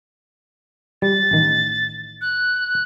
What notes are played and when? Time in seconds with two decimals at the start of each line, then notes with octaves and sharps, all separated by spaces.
1.02 G3 A6
1.31 A1 D#3
2.21 F#6